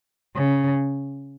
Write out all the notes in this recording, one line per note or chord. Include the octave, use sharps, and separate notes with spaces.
C#3